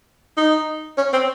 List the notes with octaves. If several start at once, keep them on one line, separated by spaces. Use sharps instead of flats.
D#4
C#4
C4